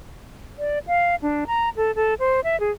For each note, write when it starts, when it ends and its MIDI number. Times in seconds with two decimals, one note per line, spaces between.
0.58 0.79 74
0.87 1.16 77
1.22 1.45 62
1.47 1.69 82
1.77 1.95 69
1.95 2.14 69
2.19 2.40 72
2.44 2.59 76
2.60 2.71 68